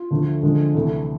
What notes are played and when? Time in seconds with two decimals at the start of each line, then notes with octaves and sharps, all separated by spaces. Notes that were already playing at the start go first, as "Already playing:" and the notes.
Already playing: F4
0.11 D2 D3 F3 A3
0.43 D2 D3 F3 G#3
0.75 D2 C3 E3 A3